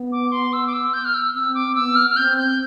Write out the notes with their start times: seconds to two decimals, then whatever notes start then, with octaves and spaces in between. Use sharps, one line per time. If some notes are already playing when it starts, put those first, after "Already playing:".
Already playing: B3
0.12 D6
0.32 C6
0.53 E6
0.67 D6
0.73 E6
0.94 G6
1.05 F6
1.14 E6
1.34 C4 E6
1.55 D6
1.75 B3 E6
1.96 F6
2.11 F6
2.16 C4 G6
2.37 G6